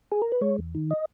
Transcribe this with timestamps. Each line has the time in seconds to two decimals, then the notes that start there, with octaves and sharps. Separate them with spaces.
0.12 G#4
0.22 A#4
0.32 B4
0.41 G#3 C#5
0.58 E2
0.75 D#3
0.91 D#5